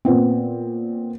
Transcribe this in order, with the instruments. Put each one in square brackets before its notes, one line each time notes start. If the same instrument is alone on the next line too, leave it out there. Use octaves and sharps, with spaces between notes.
[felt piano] A#2 B3 C4